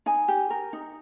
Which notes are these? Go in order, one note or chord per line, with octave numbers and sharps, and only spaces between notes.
D#4 G#5
G4
A#4
D#4